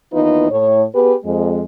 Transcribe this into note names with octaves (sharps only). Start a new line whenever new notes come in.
D#2 E3 B3 D#4 F4 B4
A2 C#5
B3 G4 G#4 B4
F2 G#3